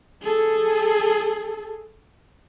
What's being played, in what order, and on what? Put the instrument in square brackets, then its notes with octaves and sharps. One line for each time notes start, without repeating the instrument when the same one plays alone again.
[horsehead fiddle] G#4 A4